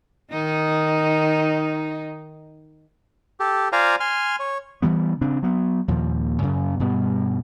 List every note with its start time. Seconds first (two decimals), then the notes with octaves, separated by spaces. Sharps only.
0.32 D#3 D#4
3.40 G4 A4
3.72 F4 C5 D5 F5 G#5 A#5
4.00 G#5 C6 F6
4.39 C#5
4.82 E3 G3 B3
5.21 C#3 C4 D4
5.42 F#3 B3
5.88 D#2 A#2 F3
6.42 F#2 C#3
6.80 G2 B2 G3 B3